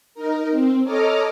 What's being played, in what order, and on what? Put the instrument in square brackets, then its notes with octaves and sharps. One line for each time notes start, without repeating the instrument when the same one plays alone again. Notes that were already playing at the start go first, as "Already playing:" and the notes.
[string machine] D#4 A#4
C4
A4 C#5 D#5 A#5 D6 F6